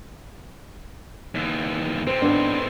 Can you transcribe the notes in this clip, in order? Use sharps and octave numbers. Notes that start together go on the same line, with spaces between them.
D#2 E3
A2 C4 C5
G#2 B3 D4